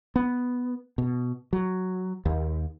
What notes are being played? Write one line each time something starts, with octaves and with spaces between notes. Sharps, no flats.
B3
B2
F#3
D#2